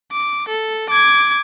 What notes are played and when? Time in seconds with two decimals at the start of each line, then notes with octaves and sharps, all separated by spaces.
0.12 D6
0.48 A4
0.90 D6 G#6